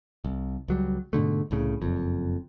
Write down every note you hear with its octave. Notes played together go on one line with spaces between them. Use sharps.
C2
C#2 F#3 G3
G#2 B2 D3 A3
C2 A2 C#3
F#1 F2